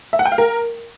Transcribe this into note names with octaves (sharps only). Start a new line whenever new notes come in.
E5
F#5
G5
F5
A#4